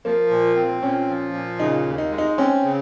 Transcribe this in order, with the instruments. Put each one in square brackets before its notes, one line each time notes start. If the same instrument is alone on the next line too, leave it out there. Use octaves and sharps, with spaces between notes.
[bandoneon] F3 [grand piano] A#3
[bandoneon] A#2
C4
[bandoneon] A#2 [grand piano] C#4
[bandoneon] F3
A#2
[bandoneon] C#3 [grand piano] D#4
[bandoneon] D#2
[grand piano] D#4
[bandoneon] G#3
[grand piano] D#4
[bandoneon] C4 [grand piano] C#4
[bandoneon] C#3